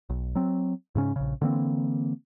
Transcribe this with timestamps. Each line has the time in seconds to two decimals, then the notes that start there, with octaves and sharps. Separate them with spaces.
0.10 B1
0.35 F#3 C4
0.95 G#2 C#3 C#4
1.16 A#1 C#3
1.42 D3 E3 A#3 C4